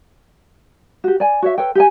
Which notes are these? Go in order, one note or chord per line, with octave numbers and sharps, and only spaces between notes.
F#4 G4
D5 G#5
F#4 C#5 E5
A4 B4 C#5 G5
G4 G5 G#5